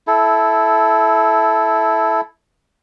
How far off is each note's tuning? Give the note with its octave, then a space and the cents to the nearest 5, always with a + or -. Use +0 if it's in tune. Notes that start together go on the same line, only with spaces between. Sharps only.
E4 +0 A4 -15